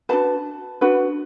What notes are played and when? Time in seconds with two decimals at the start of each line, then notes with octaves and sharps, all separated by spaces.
0.09 D4 F#4 B4 A5
0.81 D4 F#4 B4